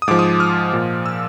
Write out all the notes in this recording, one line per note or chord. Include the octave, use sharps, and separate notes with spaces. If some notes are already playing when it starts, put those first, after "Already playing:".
D#6
G#2 F3 D6
D#6
F6
A#2 F3
E6